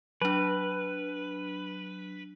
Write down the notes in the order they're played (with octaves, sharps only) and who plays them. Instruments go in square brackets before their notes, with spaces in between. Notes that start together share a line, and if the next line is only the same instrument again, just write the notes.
[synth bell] F#3 D4 [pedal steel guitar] B4